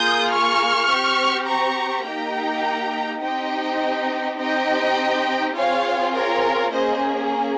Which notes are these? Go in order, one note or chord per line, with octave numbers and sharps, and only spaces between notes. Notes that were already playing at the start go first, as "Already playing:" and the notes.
Already playing: A#3 F4 G#4 D#6 G6
C#6 F6
C4 G4
A#5 C#6
A#3 D#4 G4 G5 A#5
C4 D#4 G4 D#5 G5
C4 D#4 G4 D#5 G5
C4 F4 G#4 C#5 F5
A#4 C#5
A#3 C#4 G#4 C5 D#5